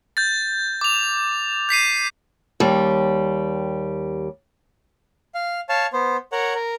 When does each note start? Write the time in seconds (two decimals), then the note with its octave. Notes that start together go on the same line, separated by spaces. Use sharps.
0.17 G6 A6
0.81 D6 F7
1.69 G6 B6 C7 D#7
2.60 D#2 G3
5.35 F5
5.69 C#5 F5 A5
5.93 B3 C5
6.32 A#4 C#5 F#5
6.54 A#4